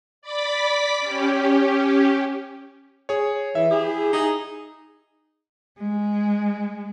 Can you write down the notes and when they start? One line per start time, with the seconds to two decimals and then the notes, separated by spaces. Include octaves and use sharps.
0.22 D5 B5 D6 B6
1.00 C#4 G4
3.09 G#4 C#5
3.55 E3 E5
3.71 E4 G4 G#4
4.13 D#4 G#4
5.80 G#3